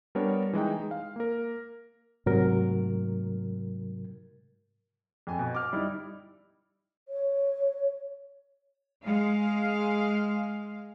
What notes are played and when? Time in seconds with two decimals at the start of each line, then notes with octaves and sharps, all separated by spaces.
0.15 G3 B3 D4 A#4 C#5
0.53 E3 G#3 D#4 G5
0.80 G#3
0.91 F5
1.16 A#3 A#4
2.26 G#2 C3 F#3 A3 A#4
5.27 F2 G#5
5.39 B2
5.55 D6 F6
5.73 G3 D#4 E4
7.08 C#5
9.03 G#3 F5